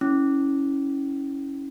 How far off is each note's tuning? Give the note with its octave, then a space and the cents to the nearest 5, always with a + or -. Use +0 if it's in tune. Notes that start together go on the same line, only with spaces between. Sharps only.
C#4 +0 E4 -25